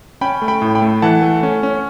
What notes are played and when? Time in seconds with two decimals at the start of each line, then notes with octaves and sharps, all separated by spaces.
0.21 C#4 G5 B5
0.42 A3
0.48 G5 B5
0.62 A2
0.75 G5 B5
0.82 A3
1.02 E3 F#5 A5
1.22 A3
1.43 C#4
1.63 C#4